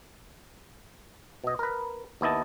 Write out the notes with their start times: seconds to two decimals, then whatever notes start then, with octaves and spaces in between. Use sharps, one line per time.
1.44 B2 D#5
1.59 A#4 B4
2.21 D#2 B3 E4 D#5 A5